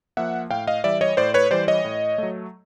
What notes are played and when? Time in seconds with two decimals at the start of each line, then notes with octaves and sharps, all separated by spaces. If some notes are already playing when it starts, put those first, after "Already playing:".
0.17 F3 A#3 E5 F#5
0.51 A2 F5 G5
0.67 D#5 F5
0.84 E3 G3 D5 E5
1.01 C#5 D#5
1.17 A2 C5 D5
1.34 B4 C#5
1.51 E3 G3 C5 D5
1.68 C#5 D#5
1.85 A2
2.18 F#3 A3